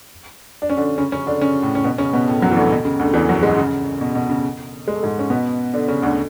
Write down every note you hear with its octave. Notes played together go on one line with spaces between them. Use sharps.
D4
C#4
D3 D4
C#3 C#4
C#3 C#4
D3 D4
C#3 C#4
A2 A3
C#4
B2 B3
C#3 C#4
B2 B3
A2 A3
F#2 F#3
E3
D2 D3
B2
C#3
D2 D3
E2 E3
F#2 F#3
G#2 G#3
C#3
B2
B2
C#3
G#3
A3
G#2 G#3
C#4
B2 B3
D3 D4
C#3 C#4
D2 D3